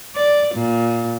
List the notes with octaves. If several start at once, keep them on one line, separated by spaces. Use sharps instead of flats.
D5
A#2